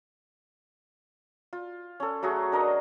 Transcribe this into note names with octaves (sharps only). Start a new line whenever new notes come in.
F4
C#4 A4
F#3 A3 F#4 G#4
D4 A#4 D#5